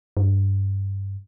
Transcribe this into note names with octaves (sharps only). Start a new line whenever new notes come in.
G2